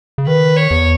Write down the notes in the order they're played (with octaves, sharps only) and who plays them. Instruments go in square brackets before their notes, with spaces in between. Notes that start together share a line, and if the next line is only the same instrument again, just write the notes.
[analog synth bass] C#3
[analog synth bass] D#3 [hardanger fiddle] B4
[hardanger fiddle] C#5
[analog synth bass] E2